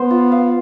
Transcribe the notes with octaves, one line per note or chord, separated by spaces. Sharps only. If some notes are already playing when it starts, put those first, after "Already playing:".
Already playing: B3 C5
F4
F5